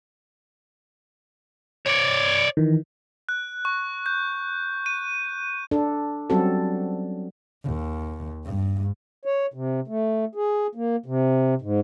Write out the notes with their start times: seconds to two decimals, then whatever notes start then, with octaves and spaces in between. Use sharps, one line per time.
1.87 C#5 D5
2.57 D#3 E3
3.29 F#6
3.65 C#6
4.06 G6
4.86 D#7
5.71 D4 A4
6.30 F#3 G3 C4 C#4 F#4 A4
7.64 D#2
8.45 G2
9.25 C#5
9.54 C3
9.88 A3
10.35 G#4
10.75 A#3
11.06 C3
11.62 G#2